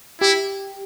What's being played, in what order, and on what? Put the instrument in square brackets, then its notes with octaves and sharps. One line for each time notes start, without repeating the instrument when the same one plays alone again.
[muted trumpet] E4 [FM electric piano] G4